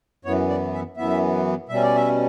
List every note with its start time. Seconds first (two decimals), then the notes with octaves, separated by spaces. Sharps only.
0.25 F#2 E3 B3 C#5
0.49 D5
0.73 E5
0.97 F#2 E3 B3 E5
1.69 B2 G3 C#4 E5
1.83 D5
1.96 E5